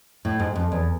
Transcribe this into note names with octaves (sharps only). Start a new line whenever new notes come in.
A2
G#2
F2
E2